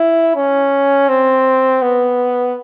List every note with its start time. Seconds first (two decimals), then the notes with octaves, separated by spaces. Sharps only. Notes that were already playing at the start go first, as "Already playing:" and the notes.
Already playing: E4
0.36 C#4
1.08 C4
1.82 B3